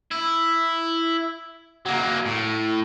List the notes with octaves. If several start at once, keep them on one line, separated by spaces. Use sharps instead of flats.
E4
F#3 A#3
A2